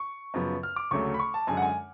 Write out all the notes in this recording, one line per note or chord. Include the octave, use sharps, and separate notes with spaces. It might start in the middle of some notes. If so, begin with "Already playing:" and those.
Already playing: C#6
F#2 C#3 F3 B3
F6
D6
D2 C#3 F#3 A3 C#6
B5
C#6
A5
F#2 D3 G#3 G#5
F#5
G#5